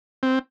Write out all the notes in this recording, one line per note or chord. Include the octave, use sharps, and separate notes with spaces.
C4